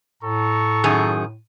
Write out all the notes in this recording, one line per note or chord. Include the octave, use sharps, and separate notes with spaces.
A2 A4 A#5 C#6
F#2 D#3 G#4